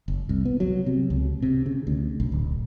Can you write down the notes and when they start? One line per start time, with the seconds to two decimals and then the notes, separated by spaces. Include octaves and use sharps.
0.08 F#1
0.29 C2
0.45 B3
0.60 F#3
0.86 C3
1.10 C#2
1.42 C3
1.66 C#3
1.87 D2
2.20 B1
2.32 D1